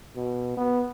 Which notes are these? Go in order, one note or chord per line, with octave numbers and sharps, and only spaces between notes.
B2
B3